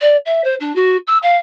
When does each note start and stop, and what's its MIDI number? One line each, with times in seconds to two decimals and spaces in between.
0.01 0.17 74
0.26 0.44 76
0.44 0.55 72
0.60 0.75 62
0.75 0.97 66
1.07 1.18 88
1.23 1.37 77